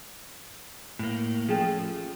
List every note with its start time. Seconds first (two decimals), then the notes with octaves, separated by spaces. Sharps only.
0.99 A2 A#3
1.48 F3 A3 C#4 G4 G#4